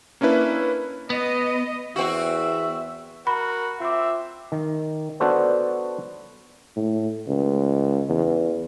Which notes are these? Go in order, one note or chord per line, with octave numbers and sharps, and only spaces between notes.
A#3 C#4 D4 E4 B4
B3 D#5
E2 C4 F#4 E5
F#4 A#4 B5
C4 F4 E5 D6
D#3
B3 D4 F#4 A4 C5 C#5
A2
C#2
E2